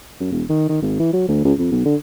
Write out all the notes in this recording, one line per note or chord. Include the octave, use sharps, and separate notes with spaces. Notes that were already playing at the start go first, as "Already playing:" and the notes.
F#2
E1
D#3
D#3
G#1
E3
F#3
D2
C#2
F2
B1
D3